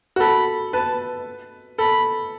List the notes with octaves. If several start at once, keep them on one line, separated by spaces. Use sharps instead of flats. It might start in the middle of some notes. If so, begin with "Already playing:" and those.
F#4
A4 B5
B4 A5
A4 B5